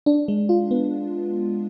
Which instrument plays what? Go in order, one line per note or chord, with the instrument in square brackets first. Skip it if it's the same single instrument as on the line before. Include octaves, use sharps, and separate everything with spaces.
[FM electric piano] D4
G#3
F4
B3